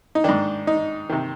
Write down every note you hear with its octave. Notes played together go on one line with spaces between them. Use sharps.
D#4
G#2 D#3 D4
D#4
C3 D#3